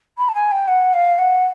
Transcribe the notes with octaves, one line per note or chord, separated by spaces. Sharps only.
B5
A5
G#5
G5
F#5
F5
F#5